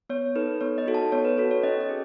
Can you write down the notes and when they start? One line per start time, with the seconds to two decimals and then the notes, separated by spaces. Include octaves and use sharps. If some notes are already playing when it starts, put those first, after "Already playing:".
0.09 B3 C#5
0.35 D#4 A4 B4
0.61 B3 C#5
0.78 D#5
0.86 D#4 F#4 A4
0.94 A5
1.12 B3 C#5
1.25 B4
1.38 F#4 A4
1.51 C#5
1.63 C#4 D#5
1.81 D#5
1.89 G#4